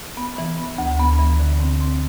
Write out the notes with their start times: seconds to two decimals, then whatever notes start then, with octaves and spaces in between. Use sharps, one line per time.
0.17 B3
0.38 E3
0.58 B3
0.78 D2
0.99 B3
1.19 E3
1.40 D3
1.60 C4
1.81 C4